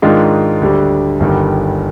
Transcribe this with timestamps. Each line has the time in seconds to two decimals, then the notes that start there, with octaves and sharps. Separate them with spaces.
0.02 G#2 D#3 G#3 D4 F4
0.61 D2 D3 G3 D4
1.20 G1 G2 D#3 G3